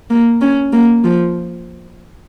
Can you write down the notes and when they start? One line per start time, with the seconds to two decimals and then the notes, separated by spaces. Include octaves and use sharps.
0.10 A#3
0.41 C#4
0.73 A#3
1.04 F3